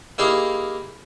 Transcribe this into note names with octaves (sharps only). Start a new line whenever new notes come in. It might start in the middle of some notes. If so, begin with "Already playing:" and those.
A#3 D#4 E4 G4 G#4 F5